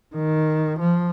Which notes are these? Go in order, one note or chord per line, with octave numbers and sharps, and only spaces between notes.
D#3
F3